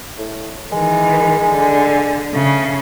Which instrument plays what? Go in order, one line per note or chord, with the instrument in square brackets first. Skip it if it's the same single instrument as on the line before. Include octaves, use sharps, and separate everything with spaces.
[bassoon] A2
[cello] D#3 E3 [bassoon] G#3
[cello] D3
[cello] C#3 [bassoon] A3